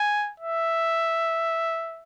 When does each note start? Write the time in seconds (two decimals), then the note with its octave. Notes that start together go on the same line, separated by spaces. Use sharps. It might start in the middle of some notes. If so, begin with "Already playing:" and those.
Already playing: G#5
0.40 E5